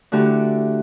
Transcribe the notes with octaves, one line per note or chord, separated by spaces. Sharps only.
D3 A3 E4 F#4 G4